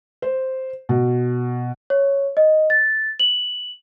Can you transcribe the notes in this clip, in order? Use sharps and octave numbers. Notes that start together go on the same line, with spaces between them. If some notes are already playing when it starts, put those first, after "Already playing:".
C5
B2
C#5
D#5
A6
F#7